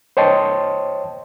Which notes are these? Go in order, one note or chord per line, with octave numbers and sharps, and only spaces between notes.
C5 C#5 D#5 G5 A5 C6